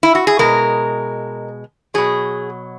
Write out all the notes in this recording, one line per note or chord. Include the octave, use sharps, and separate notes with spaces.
E4
F#4
G#4
B2 G#3 A#4
B2 F#3 G#4